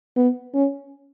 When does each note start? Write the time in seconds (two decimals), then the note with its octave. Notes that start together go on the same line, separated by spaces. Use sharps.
0.17 B3
0.54 C#4